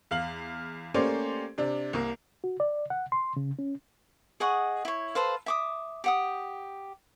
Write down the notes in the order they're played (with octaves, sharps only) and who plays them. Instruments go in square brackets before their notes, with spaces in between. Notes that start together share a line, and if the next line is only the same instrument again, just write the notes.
[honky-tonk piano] E2 F5 F#7
A3 A#3 C#4 G4 C5 D5
C3 D4
C2 A#3
[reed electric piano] F#4
D5
F#5
C6
C#3
C#4
[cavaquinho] G#4 D#5 F#5 C#6
E4 C#5
A4 B4 C5 F5
E5 D6 D#6
G4 F#5 D#6